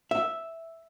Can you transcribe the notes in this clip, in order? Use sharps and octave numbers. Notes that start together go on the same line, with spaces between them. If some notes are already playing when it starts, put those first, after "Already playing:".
E5